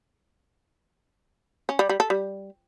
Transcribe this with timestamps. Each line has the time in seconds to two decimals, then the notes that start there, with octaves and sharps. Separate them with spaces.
1.69 C#4
1.79 G3
1.89 G3
2.00 A4
2.10 G3